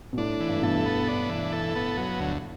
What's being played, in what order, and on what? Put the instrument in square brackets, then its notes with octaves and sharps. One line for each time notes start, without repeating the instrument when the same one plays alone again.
[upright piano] B2
[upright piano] A2 [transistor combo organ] D4
[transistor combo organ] E3
[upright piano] G2
A2
[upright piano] G2 B2 [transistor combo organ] A4
[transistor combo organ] B3
[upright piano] A2 [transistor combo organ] D4
[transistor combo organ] E3
A4
B3
F#3
D2